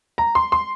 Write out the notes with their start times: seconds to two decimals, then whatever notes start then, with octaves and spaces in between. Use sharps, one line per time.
0.18 A#5
0.35 C6
0.52 C6